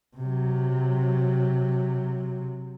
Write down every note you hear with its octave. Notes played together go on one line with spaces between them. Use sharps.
C3 F#3